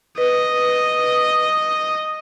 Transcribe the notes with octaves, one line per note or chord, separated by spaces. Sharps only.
B4 D#5